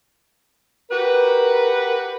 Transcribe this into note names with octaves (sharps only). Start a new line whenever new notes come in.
F#4 G4 A#4 B4